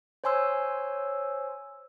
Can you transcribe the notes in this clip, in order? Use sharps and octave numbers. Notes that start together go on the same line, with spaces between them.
C5 C#5 G#5 C6 E6